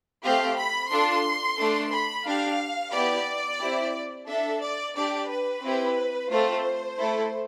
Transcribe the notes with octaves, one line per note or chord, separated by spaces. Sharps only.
A3 C4 G4 F5
B5
D4 F4 A4 C6
A3 D4 A4
B5
D4 G4 F5
B3 E4 G4 D5
C4 E4 G4
D4 A4 E5
D5
D4 G4 D5
B4
C4 E4 G4
A3 C4 F4 A4 C5
A3 E4 A4